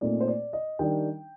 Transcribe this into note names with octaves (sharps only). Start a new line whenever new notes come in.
A#2 A3 C4 D#4 D5
C5
D5
D#5
D#3 G3 D4 G5